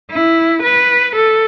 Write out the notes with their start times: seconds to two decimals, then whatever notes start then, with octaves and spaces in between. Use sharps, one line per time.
0.11 E4
0.63 B4
1.16 A4